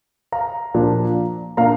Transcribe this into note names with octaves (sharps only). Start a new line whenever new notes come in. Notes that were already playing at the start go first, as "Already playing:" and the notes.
F5 A#5
A#2 F3 D4
A#2 A#3 D4 F5 A#5